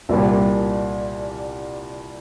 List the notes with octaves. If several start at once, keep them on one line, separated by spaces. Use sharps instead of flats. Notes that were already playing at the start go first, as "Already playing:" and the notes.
C2 A#2 G3 A#3